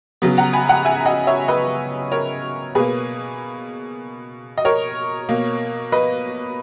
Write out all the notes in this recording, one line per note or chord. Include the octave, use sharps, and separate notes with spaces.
C#3 F#3 B3
F#5 A#5
G#5 B5
F#5 A#5
E5 G#5
D#5 F#5
C#5 E5
B4 D#5
A#4 C#5
B2 A#3 G#4 B4
D#5
A#4 C#5
B2 A#3
B4 D#5